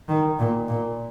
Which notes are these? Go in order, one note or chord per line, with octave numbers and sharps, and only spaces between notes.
D#3
A#2
A#2